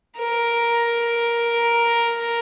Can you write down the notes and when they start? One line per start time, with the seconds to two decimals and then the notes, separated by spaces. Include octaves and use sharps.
0.19 A#4